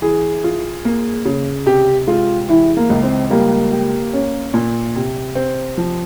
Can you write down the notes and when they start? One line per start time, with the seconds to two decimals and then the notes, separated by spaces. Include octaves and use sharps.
0.02 E3 G#4
0.44 F4
0.85 A#3
1.25 C#3
1.66 C3 G4
2.07 G#3 F4
2.49 E3 E4
2.77 A#3
2.89 C#2
3.03 C4
3.31 G3 A#3
3.71 G4
4.13 C#4
4.54 A#2
4.95 C3
5.35 C4
5.78 F3